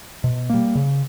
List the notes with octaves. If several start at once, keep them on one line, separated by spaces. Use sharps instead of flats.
B2
G3 A#3
C#3